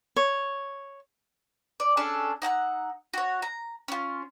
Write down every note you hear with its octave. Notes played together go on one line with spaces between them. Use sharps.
C#5
D5
C#4 D4 G#4 A4
D#4 F#5 A5 E6
F#4 C#5
A#5
C#4 F4